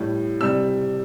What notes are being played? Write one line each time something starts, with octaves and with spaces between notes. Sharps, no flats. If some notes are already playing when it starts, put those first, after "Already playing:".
Already playing: A2 G3
C3 G3 E6